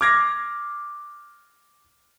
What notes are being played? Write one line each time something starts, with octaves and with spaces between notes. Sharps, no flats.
D6 F6 G#6 A#6 C7